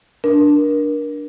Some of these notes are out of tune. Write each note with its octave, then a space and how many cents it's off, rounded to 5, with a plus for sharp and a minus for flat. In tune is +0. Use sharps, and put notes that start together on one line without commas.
D4 +0 A#4 +25